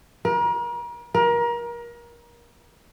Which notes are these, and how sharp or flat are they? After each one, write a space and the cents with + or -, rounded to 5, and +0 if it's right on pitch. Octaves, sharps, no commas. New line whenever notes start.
A#4 +40
A#4 +30